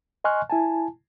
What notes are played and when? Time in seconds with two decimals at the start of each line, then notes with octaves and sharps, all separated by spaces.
0.24 D#5 G#5 C6 C#6 F6 F#6
0.50 E4 G#5 A5